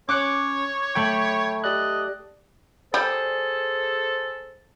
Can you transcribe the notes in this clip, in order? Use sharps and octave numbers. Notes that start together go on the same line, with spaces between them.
C#4 C#5 D6 F#6 C#7
A3 G5 B5 G#6 C#7
G4 D5 D#5 F#6
G3 G#4 A4 C5